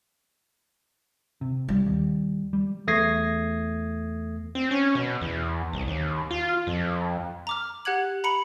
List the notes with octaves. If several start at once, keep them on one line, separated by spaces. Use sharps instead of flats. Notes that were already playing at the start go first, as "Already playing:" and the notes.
C3
G3
D#2
G3
E2 A3 D#6 G#6 A#6 C7
C4
C#4
B2
E2
C2
D#2
F4
F2
A#5 D6 F6
G4 F#5 F#6 G#6 F#7
A#5 B5 C#7 F#7